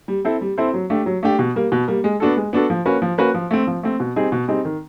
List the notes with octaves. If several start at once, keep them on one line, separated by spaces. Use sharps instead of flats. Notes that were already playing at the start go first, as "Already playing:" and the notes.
G3
C4 E4 A4 C5
G3
C4 E4 A4 C5
F#3
A3 D4 G4
F#3
A3 D4 G4
B2
G3 A#3
B2
G3 A#3
G#3
B3 D4 F#4 A4
G#3
B3 D4 F#4 A4
F3
A#3 C#4 F#4 B4
F3
A#3 C#4 F#4 B4
F3
A3 C4
F3
A3 C4
B2
G3 C4 D#4 G#4
B2
G3 C4 D#4 G#4
D#3